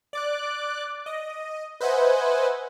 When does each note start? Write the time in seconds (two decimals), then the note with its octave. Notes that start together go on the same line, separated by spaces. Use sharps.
0.13 D5 D6 F#6
1.06 D#5
1.80 B4 C5 D#5 E5 F#5 G#5